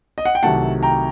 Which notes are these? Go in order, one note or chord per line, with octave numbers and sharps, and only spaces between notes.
D#5
F#5
G5
C2 C3 D#3 F#3 A3 F#5 A5
G5 A#5